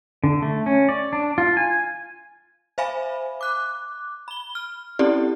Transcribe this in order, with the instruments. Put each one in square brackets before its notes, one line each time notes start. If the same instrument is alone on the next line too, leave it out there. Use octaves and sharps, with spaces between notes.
[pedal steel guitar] D3
A3
C#4
D5
D4
F4
G#5
[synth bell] C5 E5 F5 G#5 B5
D6 F#6
B5 G7
F6
C4 C#4 E4 G4 A4 D5